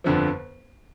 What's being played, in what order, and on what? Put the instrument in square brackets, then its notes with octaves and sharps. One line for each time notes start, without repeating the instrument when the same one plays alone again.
[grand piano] G1 F2 D3 F3